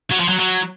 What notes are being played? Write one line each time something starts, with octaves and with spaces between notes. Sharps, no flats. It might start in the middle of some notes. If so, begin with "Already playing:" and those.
F#3
F3
F#3
F#3